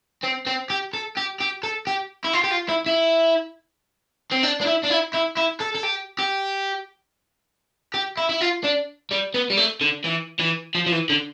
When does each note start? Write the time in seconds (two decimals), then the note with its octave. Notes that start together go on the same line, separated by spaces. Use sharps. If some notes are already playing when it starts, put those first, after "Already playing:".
0.23 C4
0.47 C4
0.70 G4
0.93 A4
1.17 G4
1.40 G4
1.63 A4
1.87 G4
2.25 E4
2.33 F4
2.44 G4
2.51 F4
2.69 E4
2.86 E4
4.32 C4
4.44 D4
4.62 D4
4.67 E4
4.84 D4
4.91 E4
5.14 E4
5.37 E4
5.61 A4
5.75 A4
5.84 G4
6.19 G4
7.94 G4
8.18 E4
8.29 E4
8.41 F4
8.64 D4
9.11 G3
9.34 B3
9.50 G3
9.57 A3
9.81 D3
10.05 E3
10.40 E3
10.75 F3
10.86 F3
10.92 E3
11.09 D3